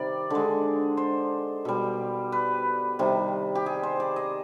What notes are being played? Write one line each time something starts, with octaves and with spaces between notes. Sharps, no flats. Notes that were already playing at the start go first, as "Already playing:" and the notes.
Already playing: C3 D#3 G3 D5
D3 G#3
C5
B2 G3
B4
C3 D#3 G3
G4
G#4
C5
D5
D#5